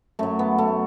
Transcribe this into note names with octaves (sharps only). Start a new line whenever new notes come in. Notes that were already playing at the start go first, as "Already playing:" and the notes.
F#2 F#3 A3
B3
A3